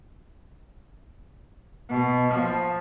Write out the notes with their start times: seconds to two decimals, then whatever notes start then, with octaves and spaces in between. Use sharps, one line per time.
1.90 B2
2.32 F3